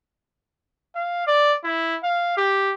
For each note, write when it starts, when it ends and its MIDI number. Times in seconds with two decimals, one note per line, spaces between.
0.95 1.25 77
1.28 1.55 74
1.64 1.96 64
2.04 2.34 77
2.37 2.74 67